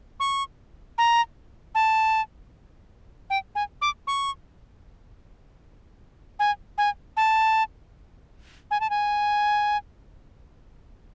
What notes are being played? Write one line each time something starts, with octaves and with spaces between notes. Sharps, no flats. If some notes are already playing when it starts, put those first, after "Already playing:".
C#6
A#5
A5
G5
G#5
D6
C#6
G#5
G#5
A5
G#5
A5
G#5